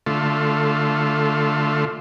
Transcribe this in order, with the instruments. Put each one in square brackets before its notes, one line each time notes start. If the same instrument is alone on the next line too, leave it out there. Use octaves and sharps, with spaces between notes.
[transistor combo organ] D3 A3 F4